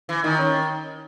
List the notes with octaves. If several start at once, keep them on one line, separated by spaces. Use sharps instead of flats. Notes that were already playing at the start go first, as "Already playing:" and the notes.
E3
D#3 D#4
C#4